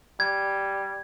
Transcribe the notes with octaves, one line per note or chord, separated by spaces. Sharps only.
G3 G#6